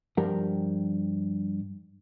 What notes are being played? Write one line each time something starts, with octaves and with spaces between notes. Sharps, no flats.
G2 F3 G4 A#4 F#5